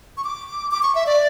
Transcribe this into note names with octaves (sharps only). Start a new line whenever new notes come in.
C#6
D6
D6
C#6
E5
D5